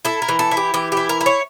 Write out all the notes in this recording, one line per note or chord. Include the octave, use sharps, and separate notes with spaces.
E4 A4
A#4
E3
A4
E4
G4
E3 G4
G4
E4
A#4
E4
C#5